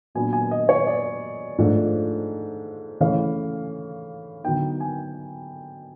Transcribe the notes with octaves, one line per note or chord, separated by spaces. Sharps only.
A#2 F#3 B3 D4 G#5
G#5
D#5
C#5
D5
G#2 F3 A3 D4 F4
C#3 E3 A3 C#4 F5
D3 F#3 B3 D#4 G5
G#5